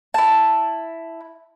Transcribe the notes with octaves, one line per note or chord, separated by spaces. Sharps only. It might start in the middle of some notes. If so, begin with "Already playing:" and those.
E4 A5